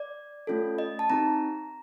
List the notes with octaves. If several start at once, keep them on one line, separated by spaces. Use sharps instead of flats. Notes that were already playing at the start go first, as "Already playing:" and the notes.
Already playing: D5
A3 C#4 F4 A4
D#5
A5
C4 D#4 G4 A#5